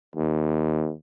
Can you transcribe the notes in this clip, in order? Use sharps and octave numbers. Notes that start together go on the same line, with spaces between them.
D#2